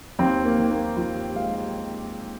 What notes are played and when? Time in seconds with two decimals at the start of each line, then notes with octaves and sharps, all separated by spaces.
0.19 D#2 C4
0.45 A#3
0.58 D#3
0.71 A#3
0.97 D#2 F4
1.16 G4
1.36 G#3 F5
1.56 F5